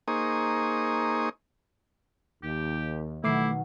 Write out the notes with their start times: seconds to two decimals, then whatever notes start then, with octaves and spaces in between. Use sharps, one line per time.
0.08 A#3 D#4 G#4 C5 C#6 D#6
2.43 D#2 G4
3.24 B2 D#3 F#3 A3 E4 D6 C7